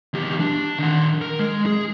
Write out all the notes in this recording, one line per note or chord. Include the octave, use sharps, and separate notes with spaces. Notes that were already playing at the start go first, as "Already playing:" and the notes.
E2 G4
D4
D#3 F#5
A#4
G#3
G#4